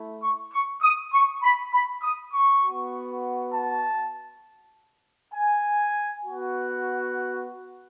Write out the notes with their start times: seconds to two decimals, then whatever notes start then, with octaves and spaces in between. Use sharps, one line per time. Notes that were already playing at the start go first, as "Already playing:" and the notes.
Already playing: A3 E4
0.22 C#6
0.52 C#6
0.82 D#6
1.12 C#6
1.42 B5
1.73 B5
2.02 D#6
2.32 C#6
2.63 B3 F#4
3.53 A5
5.34 G#5
6.24 B3 F#4